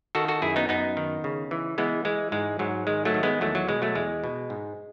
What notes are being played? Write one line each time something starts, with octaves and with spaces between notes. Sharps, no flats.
D#3 F#4 A4
F#4 A4
F#2 E4 G#4
B3 D#4
F#2 B3 D#4
D#3
C#3
E3
E3 G#3 B3
E3 G#3
G#2 G#3
G#2 F#3
D#3 G#3
F#3 A3
D#3
G#3 B3
E2 F#3 A3
F#3
B2 G#3
F#3 A3
E2 G#3
B2
G#2